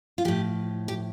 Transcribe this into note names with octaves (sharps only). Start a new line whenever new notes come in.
F4
A2 F3 G4
G4